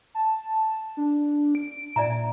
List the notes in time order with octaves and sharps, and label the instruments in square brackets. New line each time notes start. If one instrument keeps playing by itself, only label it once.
[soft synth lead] A5
D4
D7
[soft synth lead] A#2 [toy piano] D5 E5 A#5